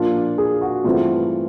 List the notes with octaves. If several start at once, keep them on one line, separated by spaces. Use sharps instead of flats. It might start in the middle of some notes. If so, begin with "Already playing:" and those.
Already playing: A#2 F3 A#3 D4 F4
G#4
F#4
G2 E3 A3 C4 F4